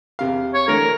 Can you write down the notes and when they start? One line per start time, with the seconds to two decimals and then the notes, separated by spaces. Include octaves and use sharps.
0.19 E2 C3 F5
0.54 C#5
0.68 D3 E3 A3 A#4